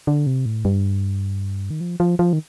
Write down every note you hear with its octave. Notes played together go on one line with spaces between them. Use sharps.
D3
C3
A2
G2
D#3
F3
F3
F3
D#3